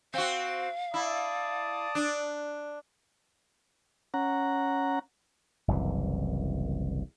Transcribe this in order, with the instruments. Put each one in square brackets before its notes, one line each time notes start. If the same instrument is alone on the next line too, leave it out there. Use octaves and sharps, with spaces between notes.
[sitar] C4 F#4 [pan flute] F5
[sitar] E4 [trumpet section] D5 A5 D#6
[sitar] D4
[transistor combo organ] C#4 F#5 A#5
[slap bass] F#1 C2 F#2 E3